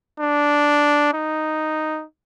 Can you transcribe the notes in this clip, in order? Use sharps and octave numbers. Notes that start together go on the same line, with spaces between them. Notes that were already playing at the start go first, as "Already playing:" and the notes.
D4
D#4